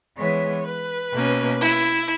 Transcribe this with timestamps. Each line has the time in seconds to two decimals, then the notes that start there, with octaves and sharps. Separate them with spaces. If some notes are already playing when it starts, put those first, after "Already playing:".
0.17 E3 G#3 B3 C#5
0.65 B4
1.13 B2 A#3 C#4
1.60 E4